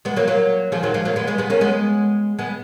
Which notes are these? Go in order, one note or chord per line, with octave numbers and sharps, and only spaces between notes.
G#3 B3
F#3 A#3
F#3 A#3
F3 G#3
D#3 F#3
F3 G#3
F#3 A#3
G#3 B3
G#3 B3
G#3 B3
A#3 C#4
G#3 B3
G#3 B3